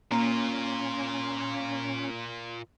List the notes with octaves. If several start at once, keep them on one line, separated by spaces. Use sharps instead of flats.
A#2 A#3 C#4 F4